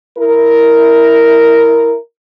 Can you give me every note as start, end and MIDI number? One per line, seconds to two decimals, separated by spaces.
0.18 1.97 64
0.18 1.97 70